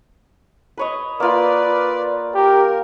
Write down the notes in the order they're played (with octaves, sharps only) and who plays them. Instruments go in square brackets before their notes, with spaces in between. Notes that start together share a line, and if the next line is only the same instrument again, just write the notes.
[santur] B4 C#5 D#5
[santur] A#3 F4 [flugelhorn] B4 [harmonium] D5
[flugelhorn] G4 [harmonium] A#4